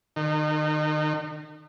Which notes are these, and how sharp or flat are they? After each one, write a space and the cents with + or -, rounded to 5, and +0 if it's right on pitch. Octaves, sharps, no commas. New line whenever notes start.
D#3 -35